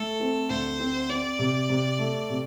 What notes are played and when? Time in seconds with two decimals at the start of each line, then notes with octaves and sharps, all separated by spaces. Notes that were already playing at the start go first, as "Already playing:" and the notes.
Already playing: A3 A4
0.20 C4
0.49 D2 C5
0.80 C4
1.09 C4 D5
1.39 C3
1.70 C3
1.99 A3
2.30 C3